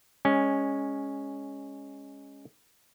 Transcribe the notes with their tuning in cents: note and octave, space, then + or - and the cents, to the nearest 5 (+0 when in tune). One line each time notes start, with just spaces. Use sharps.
G#3 -15 C#4 +0